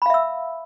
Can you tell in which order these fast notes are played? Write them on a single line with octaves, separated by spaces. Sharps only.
B5 F5 E5 E6